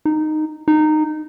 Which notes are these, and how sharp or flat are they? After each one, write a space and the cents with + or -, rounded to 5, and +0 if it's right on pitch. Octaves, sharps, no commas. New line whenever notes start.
D#4 -10
D#4 -15